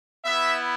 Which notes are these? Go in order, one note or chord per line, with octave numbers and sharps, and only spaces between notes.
B3 E4 E5